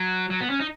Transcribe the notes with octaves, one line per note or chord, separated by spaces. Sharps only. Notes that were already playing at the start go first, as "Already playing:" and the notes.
Already playing: F#3
F#3
B3
C#4
D#4